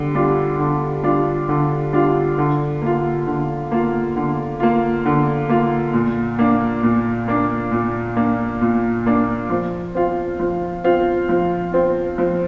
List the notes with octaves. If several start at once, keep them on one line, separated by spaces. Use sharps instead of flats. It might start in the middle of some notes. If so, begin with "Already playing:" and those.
Already playing: D3 G3
G3 D4 F4
D3
G3 D4 F4
D3
G3 D4 F4
D3
A#3 F4
D3
A#3 F4
D3
A#3 F4
D3
A#3 F4
A#2
A#3 D4
A#2
A#3 D4
A#2
A#3 D4
A#2
A#3 D4
F3
C4 F4
F3
C4 F4
F3
C4 F4
F3